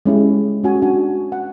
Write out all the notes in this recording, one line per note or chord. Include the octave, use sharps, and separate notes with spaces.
G#3 C#4 E4 G4
C#4 F#4 G#5
D4 F#4 G#5
F#5